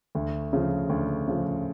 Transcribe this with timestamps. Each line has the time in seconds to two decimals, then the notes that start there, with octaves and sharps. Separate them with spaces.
0.15 D2
0.53 C#3 F3
0.89 D2
1.28 C#3 F3